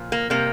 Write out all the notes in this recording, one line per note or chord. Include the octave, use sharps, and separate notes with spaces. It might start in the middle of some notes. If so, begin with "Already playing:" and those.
Already playing: A#2 F3
A#3
C3 G3 A#3